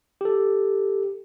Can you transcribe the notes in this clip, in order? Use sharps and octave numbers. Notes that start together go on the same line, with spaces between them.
G4 A4